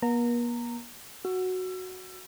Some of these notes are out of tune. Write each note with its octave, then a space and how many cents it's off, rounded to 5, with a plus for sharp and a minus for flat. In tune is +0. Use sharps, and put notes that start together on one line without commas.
A#3 +45 A#5 -20
F#4 +0 E6 +30